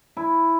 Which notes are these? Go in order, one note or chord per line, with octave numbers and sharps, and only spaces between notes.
E4